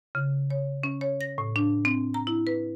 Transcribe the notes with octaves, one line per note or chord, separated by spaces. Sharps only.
C#3
C#5
C#4
C#5
A#6
A2
D4
C4
A#5
E4
B4